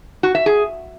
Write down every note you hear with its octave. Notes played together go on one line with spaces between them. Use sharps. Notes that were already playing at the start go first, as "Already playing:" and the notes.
F#4
E5
G#4